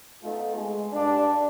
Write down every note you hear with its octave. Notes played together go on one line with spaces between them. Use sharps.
A3 B3 D#4 F4 A4
G#3
G2 D4